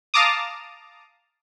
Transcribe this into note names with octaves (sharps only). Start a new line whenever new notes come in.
F5 A5 A#5 D6 D#6